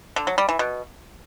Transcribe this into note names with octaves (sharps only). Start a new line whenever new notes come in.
D3
F#3
G3
E3
B2